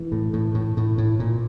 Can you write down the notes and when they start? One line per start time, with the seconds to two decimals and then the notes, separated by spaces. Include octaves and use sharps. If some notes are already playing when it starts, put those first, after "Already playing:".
Already playing: E3
0.12 A2
0.33 A2
0.54 A2
0.77 A2
0.98 A2
1.20 A#2